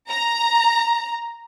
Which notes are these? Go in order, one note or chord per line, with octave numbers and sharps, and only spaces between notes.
A#5